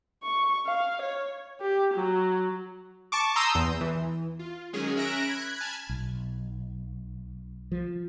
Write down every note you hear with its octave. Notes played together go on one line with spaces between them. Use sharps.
C#6
F5
C#5
G4
F#3
A5 C#6 D6
A#5 C6 D#6 E6 G6
E2
E3
F4
D#3 F#3 G#3 C#4 G#4
C#4 A#4 E5 F#6 A#6 D7
B5 F#6 G#6
G#5 A5 B5 F6 G#6
B1
F3